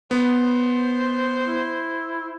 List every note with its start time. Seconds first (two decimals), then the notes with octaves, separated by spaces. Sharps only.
0.11 B3 C5
1.45 E4